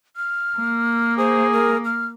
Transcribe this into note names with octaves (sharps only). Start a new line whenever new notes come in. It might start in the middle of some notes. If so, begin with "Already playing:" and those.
F6
A#3
G#4 C5
A#4
F6